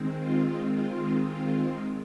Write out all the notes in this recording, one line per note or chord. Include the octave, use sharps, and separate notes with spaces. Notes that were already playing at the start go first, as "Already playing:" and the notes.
Already playing: D#3 G#3 C4
F4
D#3 G#3 C4 F4
F4